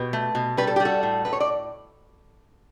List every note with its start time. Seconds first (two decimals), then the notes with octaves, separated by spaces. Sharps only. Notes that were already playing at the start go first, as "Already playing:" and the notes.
Already playing: B2 G4 B4
0.13 A3
0.35 B2
0.57 G3 B4
0.67 A4
0.76 G4
0.80 G3
0.85 F#4 A4
1.03 A2
1.25 A2 B4
1.33 C#5
1.40 D5